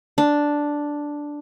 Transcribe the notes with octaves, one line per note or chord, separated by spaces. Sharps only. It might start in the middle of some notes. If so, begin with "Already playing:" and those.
D4